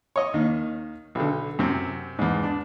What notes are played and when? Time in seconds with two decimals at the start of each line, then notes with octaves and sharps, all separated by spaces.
0.16 C#5 D#5
0.34 D#2 D#3
1.15 B1 D3
1.59 F#2 C3
2.19 E2 G#2
2.43 D4